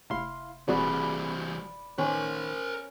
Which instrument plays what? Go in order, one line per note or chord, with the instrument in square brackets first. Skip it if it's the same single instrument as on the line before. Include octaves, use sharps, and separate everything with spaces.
[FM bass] F1 [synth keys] E4 F5 C6
[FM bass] E1 [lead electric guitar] E3 G3 [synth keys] C4 F#4 G#4 [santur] D5 B5
[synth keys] D#3 [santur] C#4 [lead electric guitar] A#4 C5